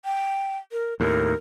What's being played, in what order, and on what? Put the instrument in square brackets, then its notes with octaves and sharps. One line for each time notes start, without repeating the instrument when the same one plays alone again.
[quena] G5
A#4
[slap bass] D#2 A2 [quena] A#4